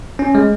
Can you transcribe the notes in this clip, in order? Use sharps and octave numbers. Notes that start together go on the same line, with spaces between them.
C#4
G#3